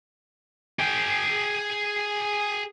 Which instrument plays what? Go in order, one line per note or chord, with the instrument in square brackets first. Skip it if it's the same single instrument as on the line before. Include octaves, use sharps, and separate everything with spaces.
[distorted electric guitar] G#4 G5